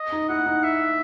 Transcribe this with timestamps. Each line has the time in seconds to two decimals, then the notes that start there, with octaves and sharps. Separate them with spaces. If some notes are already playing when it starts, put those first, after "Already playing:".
Already playing: D#5
0.12 D#4
0.29 E4 F#5
0.46 D#4
0.64 E5